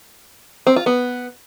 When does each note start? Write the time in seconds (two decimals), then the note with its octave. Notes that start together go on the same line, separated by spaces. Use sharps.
0.67 C4
0.76 F4
0.86 B3